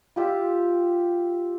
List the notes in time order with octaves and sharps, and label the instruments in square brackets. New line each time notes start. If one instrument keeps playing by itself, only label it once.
[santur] F4 G4 E5